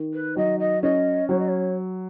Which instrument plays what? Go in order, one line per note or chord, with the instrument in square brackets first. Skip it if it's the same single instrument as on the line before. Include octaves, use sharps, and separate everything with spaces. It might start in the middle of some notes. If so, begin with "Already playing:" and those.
Already playing: [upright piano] D#3
[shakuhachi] B4
[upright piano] F#3 [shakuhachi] D#5
[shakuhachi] D#5
[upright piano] C#4 [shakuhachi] D#5
[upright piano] F#3 [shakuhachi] C#5
[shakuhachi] D#5
C#5